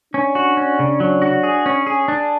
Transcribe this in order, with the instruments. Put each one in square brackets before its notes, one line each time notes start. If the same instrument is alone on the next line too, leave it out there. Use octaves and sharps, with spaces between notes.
[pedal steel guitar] C#4 [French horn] D4
[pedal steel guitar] F#4
C#4
C#3
F#3
F#4
G#4
C#4
G#4
D4